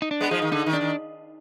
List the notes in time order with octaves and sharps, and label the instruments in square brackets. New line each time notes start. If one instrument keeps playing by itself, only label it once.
[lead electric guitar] D#4
D4
[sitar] G#3 B3
[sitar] F3 G#3 [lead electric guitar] D#4
[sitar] D#3
[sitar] D3 [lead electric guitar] D#4
[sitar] D#3
[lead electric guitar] D4
[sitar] D#3